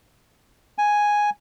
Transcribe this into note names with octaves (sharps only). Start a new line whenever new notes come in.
G#5